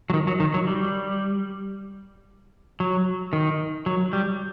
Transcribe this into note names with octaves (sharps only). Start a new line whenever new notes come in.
F#3
D#3
F#3
D#3
F#3
G3
F#3
D#3
F#3
G3